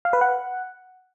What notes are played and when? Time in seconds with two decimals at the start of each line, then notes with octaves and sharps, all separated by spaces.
0.05 F5
0.13 B4
0.21 F#5